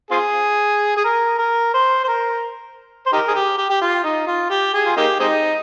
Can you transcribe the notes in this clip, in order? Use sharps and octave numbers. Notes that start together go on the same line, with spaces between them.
C4 F4 G#4
G#4
A#4
A#4
C5
C5
A#4
C5
D#4 G4 A#4
G#4
G4
G4
G4
F4
D#4
F4
G4
G#4
F4
A#3 D#4 G4
G#3 C4 D#4